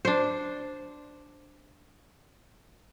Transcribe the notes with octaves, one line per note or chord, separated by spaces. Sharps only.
D4 C5